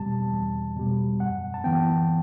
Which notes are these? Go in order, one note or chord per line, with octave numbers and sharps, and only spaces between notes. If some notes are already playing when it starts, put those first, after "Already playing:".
Already playing: E2 B2 G3 A5
E2
B2 G3
F#2 F#5
A5
E3 B3 G5